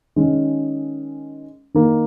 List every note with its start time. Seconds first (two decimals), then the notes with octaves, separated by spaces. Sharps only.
0.16 D#3 G#3 C#4
1.74 D#3 A#3 D#4